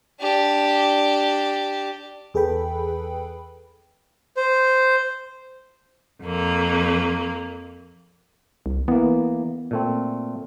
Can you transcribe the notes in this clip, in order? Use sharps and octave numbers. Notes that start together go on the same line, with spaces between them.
D4 G4
E2 G#4 A4 B4 G5 B5
C5
F2 A#3
C2
E3 A#3 B3
A#2 A3 C4